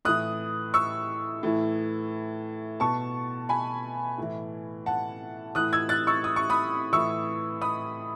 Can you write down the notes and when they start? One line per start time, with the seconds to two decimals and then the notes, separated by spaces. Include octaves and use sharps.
0.05 A2 E3 D#6 F#6
0.74 C#6 E6
1.43 A2 E3
2.80 B2 A5 C#6
3.49 G#5 B5
4.18 A2 E3
4.86 F#5 A5
5.55 A2 E3 D#6 F#6
5.73 E6 G#6
5.89 F#6 A6
6.07 C#6 E6
6.24 D#6
6.36 C#6
6.50 B5 D#6
6.93 A2 E3 C#6 E6
7.62 B5 D#6